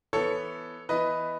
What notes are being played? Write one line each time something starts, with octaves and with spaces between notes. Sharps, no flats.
E3 B3 A4 C#5
E3 B3 B4 D#5